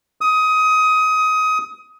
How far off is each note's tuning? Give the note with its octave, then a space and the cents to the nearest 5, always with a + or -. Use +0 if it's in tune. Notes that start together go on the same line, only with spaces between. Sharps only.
D#6 +20